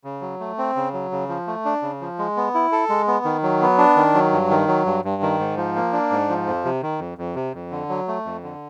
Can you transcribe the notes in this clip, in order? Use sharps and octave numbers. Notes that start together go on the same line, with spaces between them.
C#3
F#3
A3
C4
C#3
F#3
C#3
F3
A3
D4
C#3
F3
G#3
B3
E4
A4
G#3
B3
D#3
F#3
B3
D4
D#3
F#3
G2
D#3
F#3
G2
G2
D#3
G#2
F3
A#3
D4
G#2
F3
F2
C3
D#3
F2
F2
C3
F2
D3
F#3
A3
F2
D3